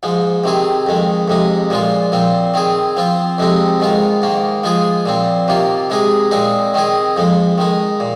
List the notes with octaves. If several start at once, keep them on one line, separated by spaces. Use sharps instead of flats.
G#2 F3 G#3
C3 D#3 C4 G#4
F2 D#3 G#3
F2 C3 G#3 D#4
A#2 F3 G#3 F4
A#2 F3 C4
D#3 C4 G#4
F3 C4 F4
F2 C3 G#3 C4 D#4
G#2 D#3 G#3 F4
G#2 D#3 A#3
F3 G#3 F4 G#4
A#2 F3 C4
C3 D#3 A#3 F4
C3 G#3 D#4 G#4
A#2 G#3 C4 D#4 G#4
D#3 C4 D#4 G#4
F2 F3 G#3
D#3 G#3 D#4
A#2